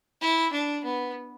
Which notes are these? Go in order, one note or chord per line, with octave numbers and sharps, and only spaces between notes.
E4
D4
B3